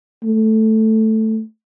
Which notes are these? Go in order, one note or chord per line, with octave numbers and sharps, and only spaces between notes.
A3